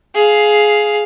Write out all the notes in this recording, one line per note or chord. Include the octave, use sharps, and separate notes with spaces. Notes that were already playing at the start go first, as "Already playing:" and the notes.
G#4 F5